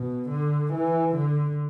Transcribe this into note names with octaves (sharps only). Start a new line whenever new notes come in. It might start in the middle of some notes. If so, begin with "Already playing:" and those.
Already playing: B2
D3
E3
D3